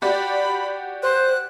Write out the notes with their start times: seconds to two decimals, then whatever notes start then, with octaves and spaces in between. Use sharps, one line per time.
0.02 F#4 G4 D5 B5
1.03 C5 F#6